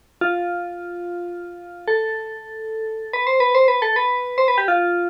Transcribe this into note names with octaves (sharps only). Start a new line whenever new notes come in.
F4
A4
B4
C5
B4
C5
B4
A4
B4
C5
B4
G4
F4